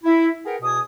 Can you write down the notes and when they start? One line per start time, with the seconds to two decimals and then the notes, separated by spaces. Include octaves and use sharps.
0.04 E4
0.45 G#4 A#4 B4 F#5 G5
0.61 E2 B2 G#5 D#6